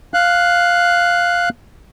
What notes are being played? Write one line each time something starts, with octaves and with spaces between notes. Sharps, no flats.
F5 F#6